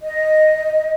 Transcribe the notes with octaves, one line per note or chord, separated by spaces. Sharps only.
D#5